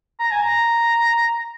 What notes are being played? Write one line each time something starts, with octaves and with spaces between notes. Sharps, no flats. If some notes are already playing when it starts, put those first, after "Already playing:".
A#5
G#5
A#5